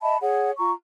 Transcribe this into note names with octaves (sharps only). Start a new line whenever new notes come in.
D#5 E5 A5 B5
G#4 C#5 F#5
F4 A#5 C#6